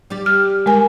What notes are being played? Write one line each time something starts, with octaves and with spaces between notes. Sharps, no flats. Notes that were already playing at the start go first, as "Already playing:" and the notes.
G3 G4 D5
F6
G#3 A#4 G#5